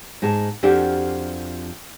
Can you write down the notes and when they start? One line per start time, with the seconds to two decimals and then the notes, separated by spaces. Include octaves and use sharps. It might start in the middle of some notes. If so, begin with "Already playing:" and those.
0.22 G#2 D#4 G#4 A5
0.63 F2 F3 D4 F#4 G4